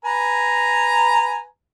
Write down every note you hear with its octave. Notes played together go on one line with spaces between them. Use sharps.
B4 G#5 A#5